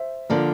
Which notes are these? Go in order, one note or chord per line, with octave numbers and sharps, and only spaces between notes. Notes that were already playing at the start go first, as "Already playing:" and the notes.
Already playing: C5 E5
D3 F3 A#3 A#4 D5